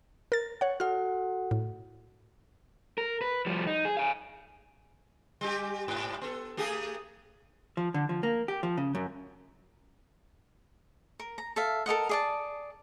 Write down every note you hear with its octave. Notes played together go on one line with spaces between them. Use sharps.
A#4 A6
C#5 F#5
F#4 A4 F#5 F6
A2
A#4
B4
F3 G3
D#4
G#4
F5 G#5
G3 G4
G#2
B3 A4
A3 G4 G#4
F3
D3
F3
A#3
G4
F3
C#3
F#2
A#4
A#5
A4 E5 F5
A4 A#4 D#5 F#5
G#4 D5 A5